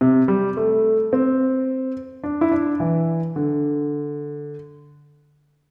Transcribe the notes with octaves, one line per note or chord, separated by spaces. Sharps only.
C3
G3
A3
C4
D4
E4
D4
E3
D3